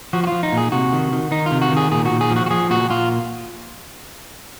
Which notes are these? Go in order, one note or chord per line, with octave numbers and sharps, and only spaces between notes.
F3 F#4
F#4
F3 F4
D#4
A#2
G#4
C3 F#4
D#3
D#3
D#3 D#4
F4
C3
F#4
D#3 G#4
A#2 G#4
F#4
A#2
G#4
F3
F#4
F#4
F3 G#4
A#2 F#4
A#2 F4